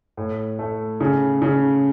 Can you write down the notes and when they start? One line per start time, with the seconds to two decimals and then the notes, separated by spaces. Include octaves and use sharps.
0.17 A2
0.59 A3
1.01 C#3
1.42 C#3